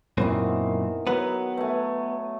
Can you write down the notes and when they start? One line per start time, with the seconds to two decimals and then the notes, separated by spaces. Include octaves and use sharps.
0.17 F#2 A#2 D#3 E3 B3 C4
1.07 F#3 B3 B4
1.57 A3 G#5